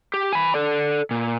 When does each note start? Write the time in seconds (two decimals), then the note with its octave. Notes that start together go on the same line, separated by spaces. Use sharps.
0.14 G4
0.33 G#5 B5
0.54 A4 D5
1.11 A#2